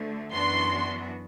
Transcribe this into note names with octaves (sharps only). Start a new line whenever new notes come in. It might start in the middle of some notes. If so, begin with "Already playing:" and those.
Already playing: D2 D3 A3
F#2 E3 B3 D4 F#4 C6